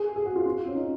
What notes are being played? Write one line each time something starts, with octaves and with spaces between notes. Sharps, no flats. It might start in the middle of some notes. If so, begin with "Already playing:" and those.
Already playing: G#4
G#4
F#4
F4
F4
C#4
D#4